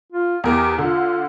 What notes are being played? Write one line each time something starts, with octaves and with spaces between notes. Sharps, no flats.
F4
E2 G4 A#4
D3 F4